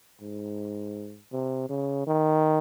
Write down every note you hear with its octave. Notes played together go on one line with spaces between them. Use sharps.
G#2
C3
C#3
D#3